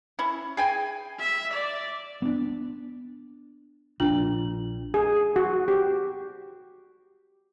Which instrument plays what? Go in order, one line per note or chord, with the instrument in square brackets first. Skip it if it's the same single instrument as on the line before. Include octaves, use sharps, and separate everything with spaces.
[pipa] C#4 E4
G#4 G5 G#5
[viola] E5
D5
[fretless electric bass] B3 D4
[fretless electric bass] A#1 A#2 [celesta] D4 F4 F#7
[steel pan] G#4
F#4
G4